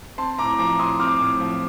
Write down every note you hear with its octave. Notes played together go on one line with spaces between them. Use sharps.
C4 A5 C6
A2 A#5 D6
F3 A#5 D6
A2 C6 D#6
C4 D6 F6
A2
F3